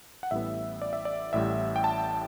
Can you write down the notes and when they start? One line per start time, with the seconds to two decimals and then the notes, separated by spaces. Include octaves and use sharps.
0.23 F#5
0.31 A1 A2 G3 B3 E5
0.82 D5
0.93 E5
1.05 D5
1.33 A1 A2 G3 E5
1.76 G5
1.84 A5